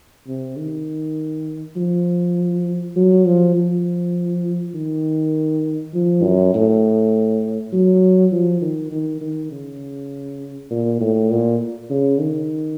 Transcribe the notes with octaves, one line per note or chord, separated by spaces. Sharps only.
C3
D#3
F3
F#3
F3
F3
D#3
F3
F#2
A2
F#3
F3
D#3
D#3
D#3
C#3
A#2
A2
A#2
C#3
D#3